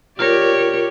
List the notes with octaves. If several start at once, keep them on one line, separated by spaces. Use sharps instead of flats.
F4 G4 A#4 C#5 D5